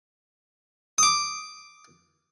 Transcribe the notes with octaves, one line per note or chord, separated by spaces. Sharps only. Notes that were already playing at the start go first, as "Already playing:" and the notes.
D6 D#6